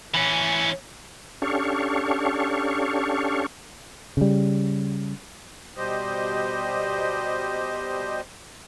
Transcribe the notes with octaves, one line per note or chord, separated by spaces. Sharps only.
E3 C#4
C#4 D4 G4 A4 F5 C#6
C#3 G3
B2 G3 G4 C5 D#5